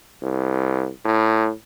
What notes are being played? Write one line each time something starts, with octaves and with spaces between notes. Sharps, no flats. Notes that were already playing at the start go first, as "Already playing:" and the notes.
C2
A2